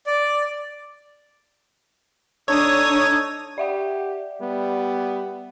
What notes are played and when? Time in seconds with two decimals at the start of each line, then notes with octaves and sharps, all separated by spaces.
0.06 D5
2.48 D4 D#4 A4 C#5 D#6 G#6
3.58 G4 D5 E5 F#5
4.42 G3 B3